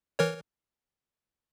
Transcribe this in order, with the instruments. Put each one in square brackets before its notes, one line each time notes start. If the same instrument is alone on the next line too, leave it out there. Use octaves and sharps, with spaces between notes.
[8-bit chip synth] E3 A#4 C#5